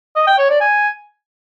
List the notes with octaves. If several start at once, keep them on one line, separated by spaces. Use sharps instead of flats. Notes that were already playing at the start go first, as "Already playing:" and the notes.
D#5
G5
C#5
D5
G#5